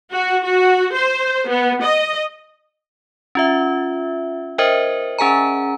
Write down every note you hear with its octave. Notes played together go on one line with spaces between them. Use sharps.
F#4
F#4
C5
B3
D#5
C#4 F4 E5
A#4 C5 D#5 E5 G5
C#4 G#4 G#5 A#5